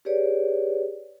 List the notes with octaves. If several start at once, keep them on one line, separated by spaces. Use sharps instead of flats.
G4 G#4 B4 C#5 D5